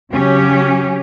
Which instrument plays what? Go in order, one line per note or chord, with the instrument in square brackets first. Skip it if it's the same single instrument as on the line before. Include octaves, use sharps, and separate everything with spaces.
[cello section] C#3 F#3 C#4 G4